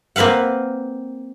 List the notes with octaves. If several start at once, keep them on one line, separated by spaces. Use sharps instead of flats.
A#3 C4 B4 F5 F#5